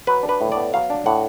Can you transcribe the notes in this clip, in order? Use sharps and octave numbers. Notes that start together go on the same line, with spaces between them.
F#3 B4
D4
B4
A2
B3 D5
F#3 F5
D4
A2 F#5